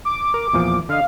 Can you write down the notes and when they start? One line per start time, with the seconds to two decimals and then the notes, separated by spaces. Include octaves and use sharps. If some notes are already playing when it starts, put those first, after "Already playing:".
0.05 D6
0.34 A#4
0.53 E2 A#2 F3
0.89 D3 D#5 F5